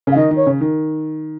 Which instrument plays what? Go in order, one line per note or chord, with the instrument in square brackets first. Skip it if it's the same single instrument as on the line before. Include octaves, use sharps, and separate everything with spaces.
[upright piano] C#3
[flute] F5
[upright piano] D#3 [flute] D#5
[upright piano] D#3 [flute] C#5
[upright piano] C#3
D#3